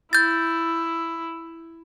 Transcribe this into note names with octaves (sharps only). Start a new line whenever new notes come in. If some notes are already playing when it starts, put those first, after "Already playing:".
E4 G6 A6